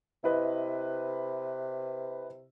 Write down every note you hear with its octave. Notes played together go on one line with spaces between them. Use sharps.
C3 E4 B4 D#5